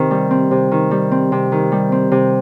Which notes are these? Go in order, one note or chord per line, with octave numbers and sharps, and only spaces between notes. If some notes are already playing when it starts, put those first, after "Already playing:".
Already playing: C3 D#3 C4
G3
C4
C3
D#3
G3
C4
C3
D#3
G3
C4
C3